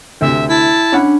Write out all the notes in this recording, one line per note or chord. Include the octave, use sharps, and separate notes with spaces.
D2 C3 E5
E4 A5
C#4 D4 F#5 B5